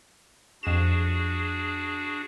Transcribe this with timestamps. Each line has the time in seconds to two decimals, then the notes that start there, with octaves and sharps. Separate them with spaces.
0.63 F2 D4 F#4 G#4 E7